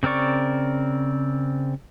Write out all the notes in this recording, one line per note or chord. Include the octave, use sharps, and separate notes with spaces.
C#3 C4 A#4 D5 C#6